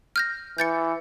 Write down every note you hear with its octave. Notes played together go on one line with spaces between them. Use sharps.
F6 G6 A#6
E3 G6 A6 C#7